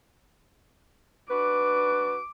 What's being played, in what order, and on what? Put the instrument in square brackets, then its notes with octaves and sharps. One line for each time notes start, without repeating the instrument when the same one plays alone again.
[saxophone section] D4 F#4 B4 [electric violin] D6